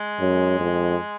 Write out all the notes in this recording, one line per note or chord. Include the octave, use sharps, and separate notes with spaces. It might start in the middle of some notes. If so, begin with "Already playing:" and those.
Already playing: G#3
F#2
F2